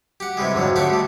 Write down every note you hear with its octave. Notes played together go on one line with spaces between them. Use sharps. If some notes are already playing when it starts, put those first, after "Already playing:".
G4 F#5
C3 E3 G3 G#3
F2 G#2 D3 F#3
A3 C4 F#4 G4 A4
G3 A3